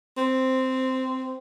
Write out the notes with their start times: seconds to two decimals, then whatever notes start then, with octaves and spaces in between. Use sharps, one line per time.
0.17 C4